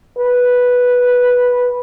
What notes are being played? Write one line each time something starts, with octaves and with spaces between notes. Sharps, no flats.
B4